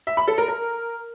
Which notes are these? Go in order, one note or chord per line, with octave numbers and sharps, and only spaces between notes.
E5
B5
A4
A#4
A#4